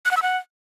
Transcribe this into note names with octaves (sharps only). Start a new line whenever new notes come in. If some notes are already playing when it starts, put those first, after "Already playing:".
F#6
F#5
E6
F#5